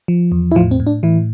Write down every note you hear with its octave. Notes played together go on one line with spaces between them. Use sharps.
F3
E2
E4
A2 F3 F4
C4
A2
D4
A2 E3 E4